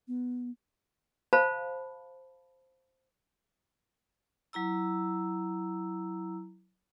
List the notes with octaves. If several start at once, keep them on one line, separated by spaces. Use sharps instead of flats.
B3
C5 F5 A5 B5
F#3 E4 A#5 E6